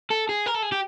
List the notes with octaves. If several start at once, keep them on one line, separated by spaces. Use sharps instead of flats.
A4
G#4
A#4
A4
G#4
G4